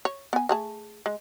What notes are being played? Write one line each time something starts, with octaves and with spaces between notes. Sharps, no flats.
C#5
B3 G#5
A3 G#4 A5
G#3